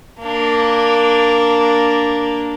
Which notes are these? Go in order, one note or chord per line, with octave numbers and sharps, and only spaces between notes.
A#3 D4